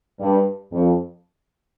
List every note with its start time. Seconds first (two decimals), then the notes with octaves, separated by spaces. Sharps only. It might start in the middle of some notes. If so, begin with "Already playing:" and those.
0.20 G2
0.72 F2